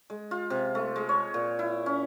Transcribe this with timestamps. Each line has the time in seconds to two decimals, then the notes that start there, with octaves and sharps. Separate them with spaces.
0.10 G#3
0.31 F4
0.50 C3
0.75 A3
0.96 G#3
1.09 C#5
1.34 A#2
1.59 E4
1.86 C#4